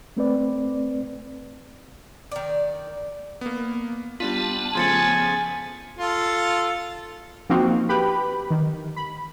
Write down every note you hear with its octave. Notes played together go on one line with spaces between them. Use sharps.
A3 C4 B4 D5
D#3 D5
A#3 B3
G3 B3 D4 F4 A5 B6
C#3 F3 A3 G#5 C6 A6 C#7
F4 A4
F3 A#3 C4 D#4 F#4
G4 B4 B5
D#3
B5